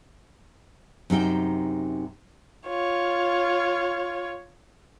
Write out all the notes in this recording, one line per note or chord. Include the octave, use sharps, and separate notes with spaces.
F#2 C3 D#4 G5
F4 C#5